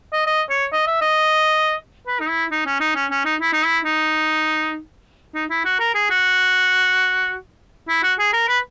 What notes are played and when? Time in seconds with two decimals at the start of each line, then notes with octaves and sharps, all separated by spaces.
0.13 D#5
0.27 D#5
0.50 C#5
0.73 D#5
0.87 E5
1.02 D#5
2.07 B4
2.20 D#4
2.29 E4
2.51 D#4
2.66 C#4
2.80 D#4
2.95 C#4
3.11 C#4
3.25 D#4
3.41 E4
3.53 D#4
3.64 E4
3.85 D#4
5.35 D#4
5.50 E4
5.65 F#4
5.80 A#4
5.95 G#4
6.10 F#4
7.89 E4
8.03 F#4
8.19 G#4
8.33 A#4
8.48 B4